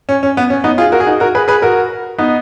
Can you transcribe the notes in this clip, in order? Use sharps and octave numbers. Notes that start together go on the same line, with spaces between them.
C#4
C#4
B3
C#4
B3 D#4
F4 G#4
F#4 A#4
G#4
D#4 F#4
F#4 A#4
G#4 B4
G#4 B4
F#4 A#4
B3 D#4